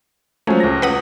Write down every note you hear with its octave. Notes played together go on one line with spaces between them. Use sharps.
F3 F#3 G#3 A3 C#4
C#2 A#6
B4 F#5 D#6